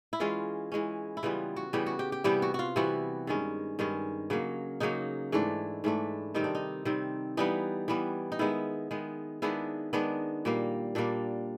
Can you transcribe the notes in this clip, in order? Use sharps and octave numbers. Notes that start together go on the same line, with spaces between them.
E4
E3 G#3 C#4 F4
E3 G#3 C#4
E4
C#3 E3 G3 B3 F4
F#4
C#3 E3 G3 B3 G4
F#4
G4
G4
C3 E3 G3 B3 G4
F#4
F4 F#4
C3 E3 G3 B3 F#4
G2 D#3 G#3 C#4
G2 D#3 G#3 C#4
C#3 F#3 A#3
C#3 F#3 A#3 D#4
G#2 E3 A3 D4
G#2 E3 A3 D4
C3 D#3 G3 C4 D#4
D4
D#4
C3 D#3 G3 C4
E3 G3 B3 D#4
E3 G3 B3
D#4
D#3 G#3 B3 E4
D#3 G#3 B3
D#3 G#3 B3 D4 E4
D#3 G#3 B3 D4
A#2 G3 A#3
A#2 G3 A#3 D4